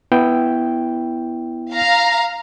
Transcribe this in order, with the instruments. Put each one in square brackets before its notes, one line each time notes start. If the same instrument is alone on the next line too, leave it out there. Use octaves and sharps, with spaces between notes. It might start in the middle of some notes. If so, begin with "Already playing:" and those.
[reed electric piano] B3 E4 G5
[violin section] F5 A#5